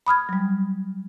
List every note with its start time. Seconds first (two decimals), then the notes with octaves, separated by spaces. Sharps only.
0.07 B5 D#6 F6 G#6
0.29 F#3 G3